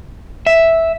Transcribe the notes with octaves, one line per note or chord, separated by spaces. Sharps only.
E5